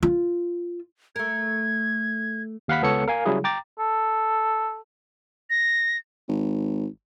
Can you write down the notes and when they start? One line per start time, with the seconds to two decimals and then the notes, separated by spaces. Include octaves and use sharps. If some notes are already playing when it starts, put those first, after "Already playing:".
0.03 F4
1.16 A3 A#4 G#6
2.68 D#2 F5 F#5 B5 B6
2.82 C#2 B3 A4 C#5 C#7
3.08 A#4 F5 G#5
3.25 C#3 F#3 G3 E4 G#4
3.44 G5 A#5 D6 A6
3.79 A4
5.50 A#6
6.28 G#1